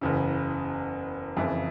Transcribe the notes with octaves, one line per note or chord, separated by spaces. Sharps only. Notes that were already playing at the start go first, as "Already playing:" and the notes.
F#1 E2 C#3
F#1 F2 C#3 E3